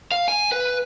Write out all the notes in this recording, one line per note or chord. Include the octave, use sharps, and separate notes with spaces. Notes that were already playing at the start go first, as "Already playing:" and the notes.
F5
G#5
B4